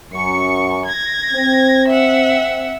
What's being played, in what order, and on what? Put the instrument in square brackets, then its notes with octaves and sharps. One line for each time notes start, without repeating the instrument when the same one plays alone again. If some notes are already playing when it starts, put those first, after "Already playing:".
[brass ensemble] F#2 [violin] C#6 C#7
[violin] G#6 A#6
[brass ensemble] C4
[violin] E5 F#5